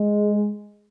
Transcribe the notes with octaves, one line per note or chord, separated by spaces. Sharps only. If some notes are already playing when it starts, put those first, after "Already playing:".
Already playing: G#3